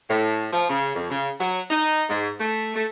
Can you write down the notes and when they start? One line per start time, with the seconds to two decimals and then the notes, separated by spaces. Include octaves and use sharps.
0.09 A2
0.52 F3
0.68 C#3
0.94 F2
1.10 C#3
1.40 F#3
1.70 D#4
2.09 G#2
2.38 A3
2.75 A3